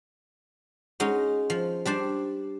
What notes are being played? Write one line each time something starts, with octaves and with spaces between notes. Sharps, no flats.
G#3 C#4 D#4 F#4
F3
G3 D4 C5 A5